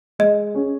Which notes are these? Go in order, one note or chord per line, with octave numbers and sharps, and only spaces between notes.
G#3 D#5
C#4 G#4